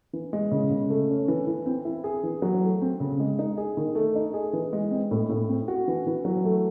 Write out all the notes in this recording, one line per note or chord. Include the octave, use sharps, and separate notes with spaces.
E3
G#3
C#3
C#3
A3
C#4
E3
E3
C4
E4
G#4
E3
F#3
A3
C4
C#3
G#3
D#4
G#4
D#3
A3
D#4
G#4
E3
G#3
C4
A2
A2
C4
F#4
E3
E3
F#3
A3